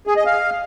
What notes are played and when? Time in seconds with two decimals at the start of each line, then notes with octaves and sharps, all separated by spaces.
0.07 G#4
0.17 D#5
0.26 F5